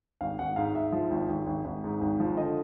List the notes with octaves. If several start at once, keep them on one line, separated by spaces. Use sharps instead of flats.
G#1 F5
G#1 F#5
G#2 F5
G#2 E5
F3
G#1
G#1
G#1
G#1
G#2
G#1
F3
D3 D#5